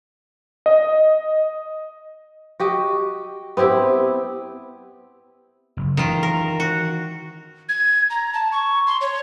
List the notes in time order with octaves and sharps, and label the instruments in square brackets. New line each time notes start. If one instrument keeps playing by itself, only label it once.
[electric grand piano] D#5
[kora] F#4 G4 D#5
B3 C4 E4 G4
[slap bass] F#1
[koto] D#3 F4 [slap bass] E3
[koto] A#4
F#4
[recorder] G#6
A#5
A5
C#6
C6
C#5